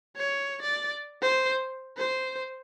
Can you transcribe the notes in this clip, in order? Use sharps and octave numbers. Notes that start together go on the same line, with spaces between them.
C#5
D5
C5
C5